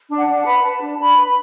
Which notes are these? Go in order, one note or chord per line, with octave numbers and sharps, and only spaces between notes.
D4
F#5
D4
F#5
B4
B5
B4 A5
D4
D4 B5
B4
B5